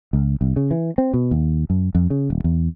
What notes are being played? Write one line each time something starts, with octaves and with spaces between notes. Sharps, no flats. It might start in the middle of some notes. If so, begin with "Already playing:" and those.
C#2
C2
C#3
E3
C4
B2
D#2
F#2
F2
C#3
D#1
E2